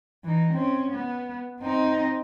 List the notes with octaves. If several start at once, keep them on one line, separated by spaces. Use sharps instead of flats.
E3 D#4
C4 C#4
B3
C4 D#4